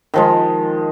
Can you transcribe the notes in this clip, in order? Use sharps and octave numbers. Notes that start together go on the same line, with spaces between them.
D#3 F3 G#3